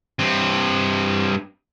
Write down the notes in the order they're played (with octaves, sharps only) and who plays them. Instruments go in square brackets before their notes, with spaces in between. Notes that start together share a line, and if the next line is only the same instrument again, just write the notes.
[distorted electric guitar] G2 C4